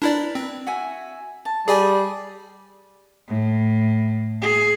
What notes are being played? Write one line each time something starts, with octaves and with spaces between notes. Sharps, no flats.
D4 E4 A#4 B4 D5
C4
F#4 E5 G#5
A5
G3 G#4 D5 G#5
A2
G#4